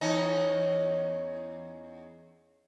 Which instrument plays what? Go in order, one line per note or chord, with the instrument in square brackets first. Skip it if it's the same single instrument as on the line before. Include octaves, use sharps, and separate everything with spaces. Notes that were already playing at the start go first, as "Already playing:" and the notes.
[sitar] E2 C#4 D#4